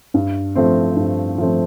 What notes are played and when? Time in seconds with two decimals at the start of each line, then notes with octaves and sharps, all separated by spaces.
0.14 G2
0.55 F3 A3 C4
0.96 G2
1.38 F3 A3 C4